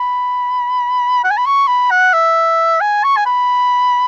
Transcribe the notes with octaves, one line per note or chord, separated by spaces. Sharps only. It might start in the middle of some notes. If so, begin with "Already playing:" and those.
Already playing: B5
F#5
G#5
B5
C#6
B5
F#5
E5
G#5
C#6
G#5
B5